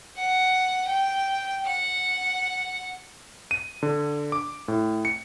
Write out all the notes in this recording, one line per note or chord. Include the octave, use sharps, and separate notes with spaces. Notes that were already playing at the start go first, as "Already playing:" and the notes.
F#5
G5
F#5
D#7
D3
D6
A2
C#7